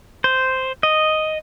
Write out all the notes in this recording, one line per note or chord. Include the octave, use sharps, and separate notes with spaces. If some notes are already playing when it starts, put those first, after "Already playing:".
C5
D#5